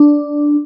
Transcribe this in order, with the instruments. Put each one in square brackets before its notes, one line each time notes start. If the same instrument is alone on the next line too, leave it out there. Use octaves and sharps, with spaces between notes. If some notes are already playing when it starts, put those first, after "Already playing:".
Already playing: [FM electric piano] D4